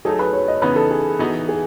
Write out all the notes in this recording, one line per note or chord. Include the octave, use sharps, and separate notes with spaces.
F#3 A3 D#4 G#4 A4
B4
C#5
D#5
C#3 E3 B3 D#4 B4
A4
G#4
E3 B3 D#4 F#4
G#4